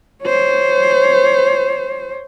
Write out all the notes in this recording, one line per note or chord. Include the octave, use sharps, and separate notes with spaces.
C5 C#5